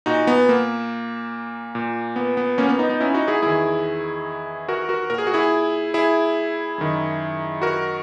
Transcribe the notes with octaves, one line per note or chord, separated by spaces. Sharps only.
A#2 D#4 F#4
B3
A#3
A#2
B3
B3
A#3 C#4
B3
B3 D#4
B3 D#4
C#4 E4
D#4 F#4
E4 G#4
E2 D#3 E4 G#4
F#4 A#4
F#4 A#4
A#2 A#4
G#4
F#4
E4 G#4
E4 G#4
F#2 D#3
F#4 A#4